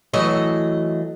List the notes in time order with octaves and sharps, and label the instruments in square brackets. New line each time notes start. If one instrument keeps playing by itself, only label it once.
[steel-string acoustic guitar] E3 F#3 A3 D#5